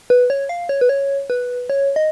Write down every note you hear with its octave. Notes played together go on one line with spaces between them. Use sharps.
B4
C#5
F5
C#5
B4
C#5
B4
C#5
D#5